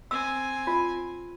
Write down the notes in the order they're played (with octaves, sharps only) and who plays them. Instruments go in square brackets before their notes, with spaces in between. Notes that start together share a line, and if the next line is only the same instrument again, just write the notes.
[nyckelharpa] C4 G#5 [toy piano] E6
[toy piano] F4